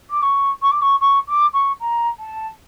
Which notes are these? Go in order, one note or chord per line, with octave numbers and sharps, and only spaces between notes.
D6
C#6
C#6
D6
C#6
C#6
D6
C#6
A#5
A5